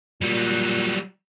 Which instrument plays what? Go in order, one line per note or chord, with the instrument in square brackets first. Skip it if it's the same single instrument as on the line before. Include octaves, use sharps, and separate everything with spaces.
[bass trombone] A#2 [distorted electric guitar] F#3 G3